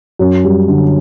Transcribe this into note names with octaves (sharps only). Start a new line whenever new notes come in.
F#2
G3
D3